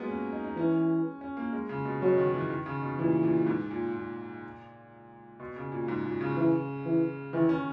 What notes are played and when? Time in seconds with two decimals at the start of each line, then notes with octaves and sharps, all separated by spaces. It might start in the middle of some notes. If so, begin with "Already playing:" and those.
Already playing: F#3 G#3 A#3 B3
0.08 C#4
0.32 D#4
0.44 D#4
0.57 E3 C#4
1.21 C#4
1.37 A#3
1.53 G#3
1.69 C#3
1.85 B2
2.02 B2 F#3
2.17 D#3
2.34 E3
2.50 D#3
2.66 C#3
2.82 B2
2.99 A#2 E3
3.23 A#2
3.46 G#2
3.71 A#2
3.96 A#2
5.40 B2
5.56 C#3
5.72 A#2
5.88 G#2
6.05 A#2
6.21 C#3
6.37 E3
6.86 E3
7.33 D#3 E3
7.49 C#4